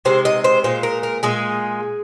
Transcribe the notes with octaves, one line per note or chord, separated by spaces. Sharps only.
C3 D#3 G#3 C5
D#5
C5
A#2 G#3 C5
A#4
A#4
A#2 G#3 G#4